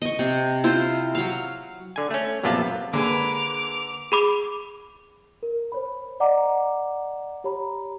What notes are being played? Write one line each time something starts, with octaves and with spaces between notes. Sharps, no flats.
D#5 C#6
C3
E4 F4 C5
F#3 F5
D3 G#5
A3 C#4
A#1 F#2 C3 B3 F4 A5
D3 A#3 G#4 B4 D6 F7
G#4 B5 D6
A#4
C5 C#5 B5
D5 D#5 F#5 A#5 D6
G4 C#5 A#5 B5